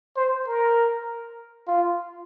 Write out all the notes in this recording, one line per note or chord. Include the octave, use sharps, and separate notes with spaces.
C5
A#4
F4